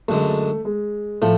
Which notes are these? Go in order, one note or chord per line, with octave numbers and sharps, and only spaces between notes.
F#2 D3 G#3 A3
G#3
A2 F3 A3